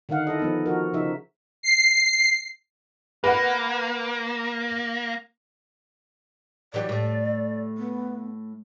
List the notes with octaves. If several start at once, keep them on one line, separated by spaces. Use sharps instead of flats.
D3 D#3 D#4 F5 F#5
E4 A4 D#5
F3 B3 D#4
F3 F#4 A#4
C#3 F3 D#4 E5
C7
A#3 B4 F#5
E3 F#3 G4 D5
A2 A3
B3